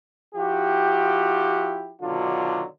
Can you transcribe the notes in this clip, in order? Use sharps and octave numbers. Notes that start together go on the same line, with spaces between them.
F3 E4 F#4 G4
B2 D3 D#3 F#3 D4 F4